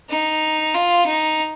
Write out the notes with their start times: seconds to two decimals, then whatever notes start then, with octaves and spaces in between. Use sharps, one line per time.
0.10 D#4
0.75 F4
1.07 D#4